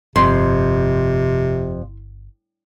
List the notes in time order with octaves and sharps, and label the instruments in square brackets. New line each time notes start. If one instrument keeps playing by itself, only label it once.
[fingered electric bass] G1 [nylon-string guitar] F2 [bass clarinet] C3 [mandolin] C6